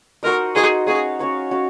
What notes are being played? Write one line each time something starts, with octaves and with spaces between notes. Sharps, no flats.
D#4 F#4 A#4 C5 D#5
D#4 F#4 G#4 C5 D#5
C#4 F#4 G#4 C#5 F5
C#4 F#4 C#5 F5
C#4 F#4 C#5 F5